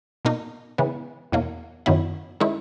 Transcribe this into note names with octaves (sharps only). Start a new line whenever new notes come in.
B2 A#3 D#4
C#3 E3 G#3 B3
E2 B2 F#3 A#3
F#2 D#3 F#3 B3 E4
D#3 G#3 C#4 E4